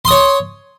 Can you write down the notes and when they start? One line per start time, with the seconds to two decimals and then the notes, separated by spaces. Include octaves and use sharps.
0.05 C6
0.08 D#6
0.11 C#5